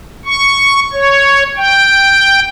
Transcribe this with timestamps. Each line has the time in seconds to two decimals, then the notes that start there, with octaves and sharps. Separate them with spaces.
0.25 C#6
0.93 C#5
1.57 G5